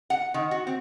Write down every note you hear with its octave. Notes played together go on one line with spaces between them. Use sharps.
F#5
D#3
F#4
C4